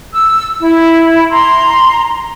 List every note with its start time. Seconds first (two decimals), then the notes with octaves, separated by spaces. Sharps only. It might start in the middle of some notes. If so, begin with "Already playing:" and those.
0.11 E6
0.61 E4
1.30 A#5 C6